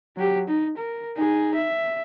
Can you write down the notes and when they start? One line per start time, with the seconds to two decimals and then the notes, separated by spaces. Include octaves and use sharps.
0.16 F#3 G4
0.48 D#4
0.78 A#4
1.16 D#4 G#4
1.55 E5